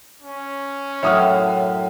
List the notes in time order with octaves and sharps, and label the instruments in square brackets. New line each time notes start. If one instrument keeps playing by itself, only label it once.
[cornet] C#4
[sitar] F#2 A2 [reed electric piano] C#5 F#5 [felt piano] E5 D#6 F6